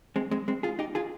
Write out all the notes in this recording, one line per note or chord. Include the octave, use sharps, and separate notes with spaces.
G#3 C4
G#3 C4
G#3 C4
F4 G#4
D#4 G4
F4 G#4